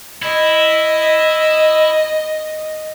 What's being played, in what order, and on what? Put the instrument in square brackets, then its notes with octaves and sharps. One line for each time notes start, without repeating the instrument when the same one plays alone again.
[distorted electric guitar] E4 [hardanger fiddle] D#5